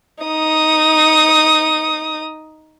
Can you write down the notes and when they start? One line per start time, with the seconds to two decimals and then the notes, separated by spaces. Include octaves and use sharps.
0.24 D#4 D#6